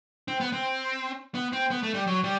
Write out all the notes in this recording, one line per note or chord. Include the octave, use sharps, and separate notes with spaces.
C4
B3
C4
B3
C4
B3
A3
G3
F#3
G3